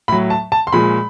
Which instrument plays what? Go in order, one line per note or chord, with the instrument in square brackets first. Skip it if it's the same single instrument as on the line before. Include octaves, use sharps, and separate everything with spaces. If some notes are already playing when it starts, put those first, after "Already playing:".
[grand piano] A2 F#3 B5
A5
A5
C6
A#2 F3 G#3 B5